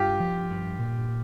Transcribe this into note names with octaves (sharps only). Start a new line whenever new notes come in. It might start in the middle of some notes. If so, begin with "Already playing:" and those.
Already playing: G2 F4 G4
F3
G2
A#2